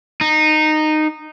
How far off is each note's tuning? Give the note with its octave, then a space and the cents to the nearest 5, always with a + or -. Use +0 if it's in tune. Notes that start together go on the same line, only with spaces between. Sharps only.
D#4 -15